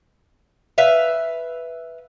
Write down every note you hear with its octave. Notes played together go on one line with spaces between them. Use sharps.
B4 E5 F5